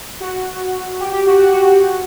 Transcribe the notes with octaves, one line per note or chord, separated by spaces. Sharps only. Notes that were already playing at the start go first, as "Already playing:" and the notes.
F#4
G4
G4
F#4
F#4
F#4
F#4